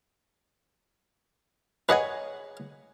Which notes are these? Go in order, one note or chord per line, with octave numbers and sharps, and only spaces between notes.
G#4 B4 C#5 D#5 F#5 G#5